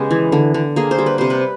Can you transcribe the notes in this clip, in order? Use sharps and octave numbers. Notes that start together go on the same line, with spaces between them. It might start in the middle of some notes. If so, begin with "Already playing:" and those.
Already playing: C#3 G#3 B3 G4
E3
D3
D3
A#3 G#4
C5
G3
B4
C3 C5
B4